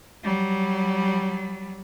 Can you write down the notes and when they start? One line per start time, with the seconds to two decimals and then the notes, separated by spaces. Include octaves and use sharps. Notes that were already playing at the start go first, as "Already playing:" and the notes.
0.24 F#3 G3